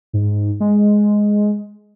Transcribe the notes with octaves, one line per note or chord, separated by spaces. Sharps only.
G#2
G#3